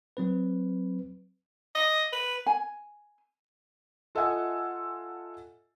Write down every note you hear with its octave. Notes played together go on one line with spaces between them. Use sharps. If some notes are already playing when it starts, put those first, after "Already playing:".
F#3 C4 B4
D#5
B4
G#5
F4 A4 D#5 E5 F#5 G#5